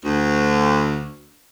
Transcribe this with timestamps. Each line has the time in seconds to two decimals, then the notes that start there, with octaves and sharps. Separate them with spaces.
0.05 D2